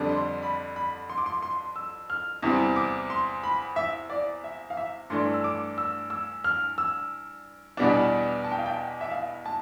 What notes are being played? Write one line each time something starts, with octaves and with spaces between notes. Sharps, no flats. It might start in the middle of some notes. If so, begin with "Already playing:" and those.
Already playing: F2 D3 G3 D4
C6
B5
B5
C6
D6
C6
C6
E6
F6
E2 C3 G3 C4
D6
C6
B5
E5
D5
E5
F5
E5
G2 E3 A3 D4 C6
E6
D6
E6
E6
F6
E6
E2 B2 G3 B3 D4
A5
G5
F5
G5
E5
F5
A5